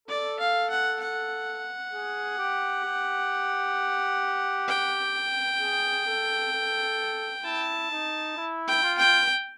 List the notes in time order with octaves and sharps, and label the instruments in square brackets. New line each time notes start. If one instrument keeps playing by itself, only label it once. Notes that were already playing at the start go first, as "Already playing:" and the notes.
[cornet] A4 [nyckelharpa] D5
[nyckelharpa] F5
F#5
F#5
[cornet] G#4
G4
G4
[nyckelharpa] G5
[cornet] G#4
A4
A4
[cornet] E4 [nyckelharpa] A5
[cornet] D#4
E4
[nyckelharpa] G5
[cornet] F4
[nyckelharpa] G5